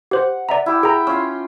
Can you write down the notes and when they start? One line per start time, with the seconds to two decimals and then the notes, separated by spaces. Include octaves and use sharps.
0.11 G4 C5 F#5
0.49 D5 E5 A#5
0.66 E4 G4
0.83 G#4 G5 A#5
1.07 C#4 F4 E6